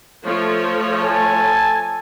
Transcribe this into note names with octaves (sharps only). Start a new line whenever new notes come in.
F3 A3 C#5
A4 G#5 A5